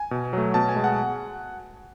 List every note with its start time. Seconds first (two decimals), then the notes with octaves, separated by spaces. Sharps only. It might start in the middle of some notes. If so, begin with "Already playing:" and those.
Already playing: G#5
0.11 B2
0.33 F#3 A3
0.54 B2 A5
0.69 G#5
0.76 G#3
0.84 F#5